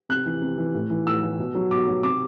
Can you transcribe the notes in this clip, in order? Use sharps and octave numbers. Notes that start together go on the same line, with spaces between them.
C3 F#6
E3
C3
E3
A2
E3
A2 E6
E3
B2
F#3
B2 D6
F#3
C3 D6